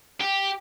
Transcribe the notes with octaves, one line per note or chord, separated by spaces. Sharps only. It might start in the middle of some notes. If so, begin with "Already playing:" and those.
G4